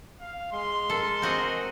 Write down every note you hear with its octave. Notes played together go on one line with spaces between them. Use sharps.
F5
G#3 C6
A4 A#4
C4 F#4 D#5